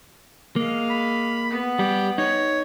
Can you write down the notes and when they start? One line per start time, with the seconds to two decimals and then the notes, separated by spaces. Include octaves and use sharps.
0.56 G#3 A#3 F5
0.90 B5
1.51 B3 F#5
1.79 G3 G4
2.18 D#4 C#5